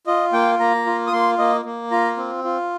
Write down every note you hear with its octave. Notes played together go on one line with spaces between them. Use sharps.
F4 D#5
A#3 G5
A#3 A#5
F4
D#6
A#3 C6
A#3 D#5
A#3
F4 A#5
C4
F4